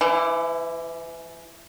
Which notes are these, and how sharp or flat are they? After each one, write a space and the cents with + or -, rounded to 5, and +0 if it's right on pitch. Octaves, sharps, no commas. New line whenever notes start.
E3 +30 E4 -15